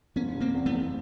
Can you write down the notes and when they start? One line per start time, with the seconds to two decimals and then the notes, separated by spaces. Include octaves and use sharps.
0.16 F#1 B3 C#4
0.35 C3
0.41 A#3 C4
0.54 E2
0.66 A3 B3
0.72 F#1